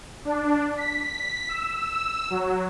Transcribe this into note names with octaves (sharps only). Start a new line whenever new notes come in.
D4
B6
E6
F#3